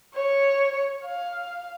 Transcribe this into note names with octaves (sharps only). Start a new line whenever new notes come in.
C#5
F5